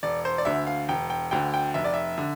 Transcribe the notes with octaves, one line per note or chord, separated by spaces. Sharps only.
E1 D5
C5
D5
D2 D3 E5
F5
E1 G5
G5
D2 D3 G5
G5
F1 E5
D5
E5
D3